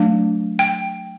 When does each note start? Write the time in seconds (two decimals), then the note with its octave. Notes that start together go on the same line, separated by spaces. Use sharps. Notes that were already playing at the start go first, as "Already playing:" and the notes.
Already playing: F#3 A3 D4
0.59 G5